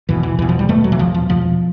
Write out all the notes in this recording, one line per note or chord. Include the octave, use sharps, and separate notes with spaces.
E2 B2 E3
E3
E2 B2 E3
F3
G3
E2 B2 A3
F#3
E3
E2 B2 F3
F3
E2 B2 F3